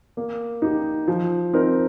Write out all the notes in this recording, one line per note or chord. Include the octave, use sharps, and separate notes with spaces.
A#3
D#4 G4
F3
C4 D#4 A#4